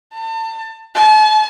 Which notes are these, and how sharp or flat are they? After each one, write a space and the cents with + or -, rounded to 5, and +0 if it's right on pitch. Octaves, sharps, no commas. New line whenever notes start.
A5 +35
A5 -40